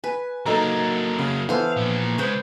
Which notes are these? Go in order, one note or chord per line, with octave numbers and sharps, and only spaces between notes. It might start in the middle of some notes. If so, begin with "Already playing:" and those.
B4 G#5
F#3 A#3 D#4 A4 A#5
C#3
E3 B3 A4 C5 F5
A#2 F3
C#3 G#3 B4 C5 G5